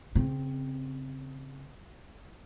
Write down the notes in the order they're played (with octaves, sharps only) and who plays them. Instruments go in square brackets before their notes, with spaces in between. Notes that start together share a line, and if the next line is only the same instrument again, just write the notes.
[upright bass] C#3 C4